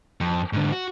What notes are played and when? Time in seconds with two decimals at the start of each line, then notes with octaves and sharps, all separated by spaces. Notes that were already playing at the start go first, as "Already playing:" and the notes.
0.21 F2
0.53 G#2 D3
0.72 F#4